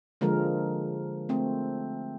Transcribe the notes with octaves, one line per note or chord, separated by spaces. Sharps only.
D3 F3 G#3 A#3 A#4
A3 C4